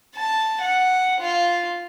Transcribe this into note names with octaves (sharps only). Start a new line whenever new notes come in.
A5
F#5
F4